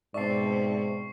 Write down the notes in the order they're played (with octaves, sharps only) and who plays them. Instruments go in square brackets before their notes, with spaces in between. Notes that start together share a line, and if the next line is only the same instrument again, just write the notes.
[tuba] G#2 [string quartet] B2 C4 [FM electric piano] D5 E5 A5 [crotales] C#6 C7